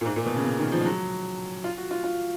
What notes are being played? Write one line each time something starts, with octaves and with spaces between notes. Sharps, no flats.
A#2
G#2
A#2
B2
C#3
C#3
D#3
F3
G#3
F#3
F4
F#4
F4
F4